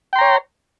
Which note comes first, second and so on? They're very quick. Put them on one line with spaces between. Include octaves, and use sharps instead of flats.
G5 C6 A#5 C#5